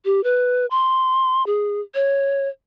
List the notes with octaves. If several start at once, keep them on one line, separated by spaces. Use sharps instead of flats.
G4
B4
C6
G#4
C#5